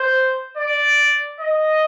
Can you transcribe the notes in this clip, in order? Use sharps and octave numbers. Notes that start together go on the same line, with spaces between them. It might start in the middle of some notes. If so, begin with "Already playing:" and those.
Already playing: C5
D5
D#5